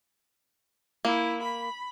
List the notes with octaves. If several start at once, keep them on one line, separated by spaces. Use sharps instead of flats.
A#3 E4
B5